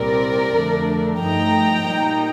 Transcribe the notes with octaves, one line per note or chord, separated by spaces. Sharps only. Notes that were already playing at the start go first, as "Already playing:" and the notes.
Already playing: C2 A#2 G3 C4 A#4 D5
F2 D3 A3 D4
G2 F3 A3 D#4 G5 A#5
A#2 G3 A#3 D#4